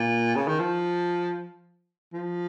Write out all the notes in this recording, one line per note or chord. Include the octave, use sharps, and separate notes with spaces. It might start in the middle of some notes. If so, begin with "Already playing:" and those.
Already playing: A#2
C#3
D#3
F3
F3